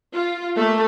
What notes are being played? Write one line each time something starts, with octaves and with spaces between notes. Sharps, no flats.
F4
A3 A#3